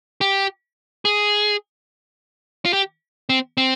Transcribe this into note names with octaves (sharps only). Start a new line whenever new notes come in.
G4
G#4
F4
G4
C4
C4